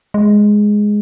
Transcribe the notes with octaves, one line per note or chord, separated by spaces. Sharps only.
G#3